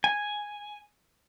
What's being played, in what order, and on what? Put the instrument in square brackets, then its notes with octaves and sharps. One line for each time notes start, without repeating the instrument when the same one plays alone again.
[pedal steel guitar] G#5